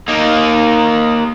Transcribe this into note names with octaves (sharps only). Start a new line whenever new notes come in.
A#3 D#4